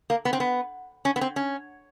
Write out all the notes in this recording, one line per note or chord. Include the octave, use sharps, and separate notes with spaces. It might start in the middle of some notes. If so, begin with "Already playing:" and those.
A#3
B3
C4
B3
C#4
B3
C4
C#4